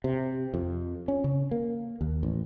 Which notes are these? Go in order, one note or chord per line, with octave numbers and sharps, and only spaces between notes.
C3
F2
C#4
C#3
A#3
D#2
A1